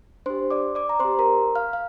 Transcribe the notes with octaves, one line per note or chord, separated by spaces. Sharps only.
D4 G4 C5 C6
D5 D6
D5 D6
A#5
C4 G4 C5 C6
A#4 A#5
F5 F6
F5